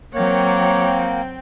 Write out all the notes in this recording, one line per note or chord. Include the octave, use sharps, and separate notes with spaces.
F#3 A#3 C4 C#5 F#5 G5